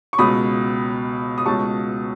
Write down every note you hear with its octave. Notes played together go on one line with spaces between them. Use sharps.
C#6
C#2 B2 B5 D#6
D#6
C#2 B2 A5 C#6